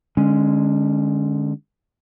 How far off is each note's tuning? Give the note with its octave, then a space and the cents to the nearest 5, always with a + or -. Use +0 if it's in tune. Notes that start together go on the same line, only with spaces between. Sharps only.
D3 +30 G#3 +0 C#4 +0